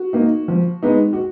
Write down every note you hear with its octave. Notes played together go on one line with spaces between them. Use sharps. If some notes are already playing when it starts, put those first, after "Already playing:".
Already playing: F#4
A#3 D#4
F3
G#3 B3 D#4
F#4